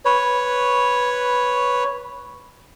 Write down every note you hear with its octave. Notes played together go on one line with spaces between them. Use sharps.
B4 C#5